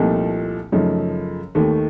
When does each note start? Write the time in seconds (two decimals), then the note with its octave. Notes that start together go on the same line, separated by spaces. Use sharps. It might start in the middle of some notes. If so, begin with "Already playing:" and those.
Already playing: C2 A#2 F3 A3 D#4
0.72 F#2 C#3 F3 A3 D#4
1.55 D#2 D#3 A3